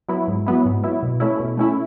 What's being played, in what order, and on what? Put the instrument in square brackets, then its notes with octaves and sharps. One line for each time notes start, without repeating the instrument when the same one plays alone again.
[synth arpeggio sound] F#3 B3 E4
G#2
F#3 B3 E4
G#2
F#3 B3 E4
B2
A3 C#4 E4
B2
A3 C#4 E4